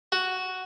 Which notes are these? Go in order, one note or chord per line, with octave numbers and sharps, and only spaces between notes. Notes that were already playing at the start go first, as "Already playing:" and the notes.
F#4